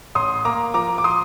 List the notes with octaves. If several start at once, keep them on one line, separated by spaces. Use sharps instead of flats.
A1 C6 D#6
A#3 A#5 D6
F3 A#5 D6
D6
C6 D#6